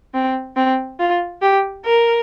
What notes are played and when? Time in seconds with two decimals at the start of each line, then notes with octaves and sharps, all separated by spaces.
0.14 C4
0.56 C4
1.00 F4
1.42 G4
1.85 A#4